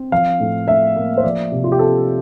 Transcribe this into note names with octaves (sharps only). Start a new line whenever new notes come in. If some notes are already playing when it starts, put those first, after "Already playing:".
Already playing: C4
F3 F5
A2
A2 E5
A#3
C5
F3 D5
C3
F4
G4
C4 A4